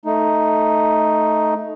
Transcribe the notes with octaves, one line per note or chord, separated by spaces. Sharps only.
A3 D#4